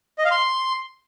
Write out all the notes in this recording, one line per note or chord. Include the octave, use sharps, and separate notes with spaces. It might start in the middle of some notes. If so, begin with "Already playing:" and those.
D#5
F5
C6